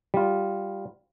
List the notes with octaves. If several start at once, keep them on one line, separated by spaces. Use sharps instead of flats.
G3 F4